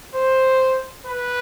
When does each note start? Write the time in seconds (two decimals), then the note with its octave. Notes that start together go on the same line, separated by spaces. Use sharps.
0.14 C5
1.06 B4